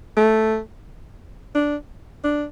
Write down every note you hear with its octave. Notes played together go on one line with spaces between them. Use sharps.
A3
D4
D4